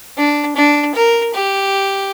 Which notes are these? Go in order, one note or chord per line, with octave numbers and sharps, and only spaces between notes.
D4
D4
A#4
G4